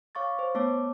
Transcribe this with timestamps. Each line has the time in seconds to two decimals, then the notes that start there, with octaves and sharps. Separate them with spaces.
0.15 C#5 F5 C#6 D6 A6
0.39 C5
0.55 A3 B3 C#5 A5 D6